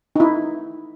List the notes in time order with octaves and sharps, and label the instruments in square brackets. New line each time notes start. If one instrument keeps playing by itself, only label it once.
[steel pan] D#4 E4